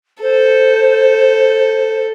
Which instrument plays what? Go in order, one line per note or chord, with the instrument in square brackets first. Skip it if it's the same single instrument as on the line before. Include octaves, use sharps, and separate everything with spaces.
[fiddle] A4 [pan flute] C5